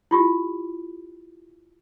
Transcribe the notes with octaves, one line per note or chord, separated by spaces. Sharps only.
E4 F4 G4